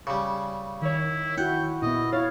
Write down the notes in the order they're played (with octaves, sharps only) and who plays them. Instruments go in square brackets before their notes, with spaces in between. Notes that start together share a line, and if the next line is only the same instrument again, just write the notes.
[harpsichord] C#3 G3
[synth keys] D#3 C#5 [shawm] E4
[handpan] E4 F#4 [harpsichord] F#5 [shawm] G5
[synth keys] A#2 B3 [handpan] E4 [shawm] D#5
[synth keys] E4 A6 [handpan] C#5 [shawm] F5